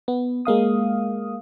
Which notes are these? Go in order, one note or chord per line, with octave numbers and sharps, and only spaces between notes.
B3
G#3 A#3 F5 D#6